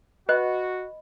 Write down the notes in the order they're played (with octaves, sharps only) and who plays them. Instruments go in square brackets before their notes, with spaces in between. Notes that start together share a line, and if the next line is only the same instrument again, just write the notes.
[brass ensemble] F#4 [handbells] B4 F#6 [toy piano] D#5 B5